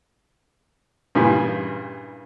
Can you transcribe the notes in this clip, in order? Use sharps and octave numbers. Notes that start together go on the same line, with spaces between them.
G2 A#2 C#3 E3 G3